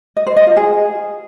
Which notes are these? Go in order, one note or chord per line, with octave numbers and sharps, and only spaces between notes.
D#5
C5
D#5
F4
G#4